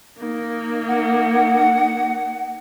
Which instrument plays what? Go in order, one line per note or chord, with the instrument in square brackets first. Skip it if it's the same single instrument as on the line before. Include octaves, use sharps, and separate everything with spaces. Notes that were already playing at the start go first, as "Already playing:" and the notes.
[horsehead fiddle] A#3 D#4
[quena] F#5